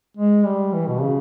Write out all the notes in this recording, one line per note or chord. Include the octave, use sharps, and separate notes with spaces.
G#3
G3
E3
B2
C#3